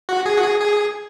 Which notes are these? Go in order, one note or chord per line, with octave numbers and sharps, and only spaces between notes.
F#4
G#4
F#4
G#4
G#4